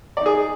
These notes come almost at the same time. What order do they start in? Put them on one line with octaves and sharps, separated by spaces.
D5 D#4 G#4